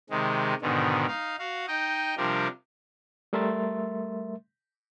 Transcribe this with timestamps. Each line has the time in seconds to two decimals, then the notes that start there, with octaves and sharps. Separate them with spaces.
0.10 C3 D#3 G#3
0.61 G#2 B2 D3 D#3
1.08 D#4 F5
1.39 F#4 F5
1.68 D#4 D#5 G5
2.17 C3 F3 G3 D4 A#4
3.33 G3 A3 A#4 E5 C6 A6